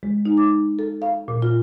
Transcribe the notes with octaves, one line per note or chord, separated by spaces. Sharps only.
G#3
D#4
D6
A4
F5
A#2
F4